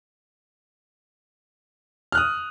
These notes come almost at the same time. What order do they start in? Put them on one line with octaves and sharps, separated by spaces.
F6 F#6 D#6